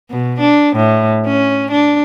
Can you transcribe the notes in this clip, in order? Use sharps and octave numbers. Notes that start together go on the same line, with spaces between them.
B2
D4
A2
C#4
D4